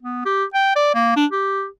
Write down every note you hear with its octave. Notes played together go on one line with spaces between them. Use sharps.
B3
G4
G5
D5
A#3
D4
G4